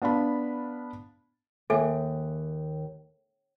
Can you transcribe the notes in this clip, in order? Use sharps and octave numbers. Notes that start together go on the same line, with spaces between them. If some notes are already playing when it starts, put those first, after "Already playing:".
B3 D4 F5 A5 B5
D#2 A4 E5 G#5